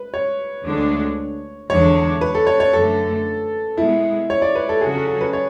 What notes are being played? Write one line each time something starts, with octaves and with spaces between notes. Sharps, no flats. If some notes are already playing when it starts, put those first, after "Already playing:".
Already playing: B4
C#5
D2 D3 G#3 D4
E2 D3 G#3 D4 C#5
B4
A4
C#5
C#5
F#2 D3 A3 A4
B2 G#3 B3 E4
C#5
D5
B4
A4
C#3 F#3 C#4 F#4 G#4
A4
A4
B4
C#5